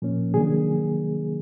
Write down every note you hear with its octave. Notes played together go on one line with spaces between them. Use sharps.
A#2 F3 A#3 C#4
C3 D#3 F#3 A#3 D4 G#4